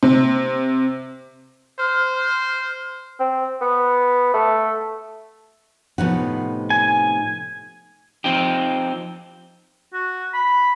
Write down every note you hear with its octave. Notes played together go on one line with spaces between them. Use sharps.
C3
C5 F6
C4
B3
A3
A2 C3 F3 B3 D#4 F#5
G#5
F3 C4 D#4 G4
F#4
B5